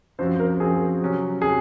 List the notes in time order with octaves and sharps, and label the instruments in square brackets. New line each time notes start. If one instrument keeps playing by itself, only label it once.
[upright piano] F#2 F3 C4 F#4 [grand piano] C5
[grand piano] A#4
[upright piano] F#2 F3 C4 F#4 [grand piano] G#4
[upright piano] C3 F#3 C#4
[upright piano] C3 F#3 C#4 [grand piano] G#4